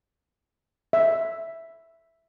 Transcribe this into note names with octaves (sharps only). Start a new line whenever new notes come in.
E5